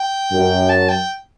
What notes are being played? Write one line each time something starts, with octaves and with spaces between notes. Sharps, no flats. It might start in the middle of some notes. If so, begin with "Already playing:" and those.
Already playing: G5
F#2
A5
G5